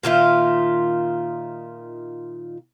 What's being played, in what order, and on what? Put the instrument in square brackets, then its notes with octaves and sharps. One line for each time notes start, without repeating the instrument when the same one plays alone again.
[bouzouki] A#2 D#3 F4 E5